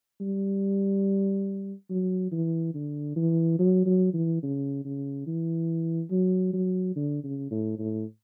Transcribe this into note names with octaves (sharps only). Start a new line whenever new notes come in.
G3
F#3
E3
D3
E3
F#3
F#3
E3
C#3
C#3
E3
F#3
F#3
D3
C#3
A2
A2